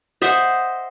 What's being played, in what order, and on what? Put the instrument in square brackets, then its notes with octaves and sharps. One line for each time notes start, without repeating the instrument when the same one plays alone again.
[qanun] C5 D#5 E5 F#5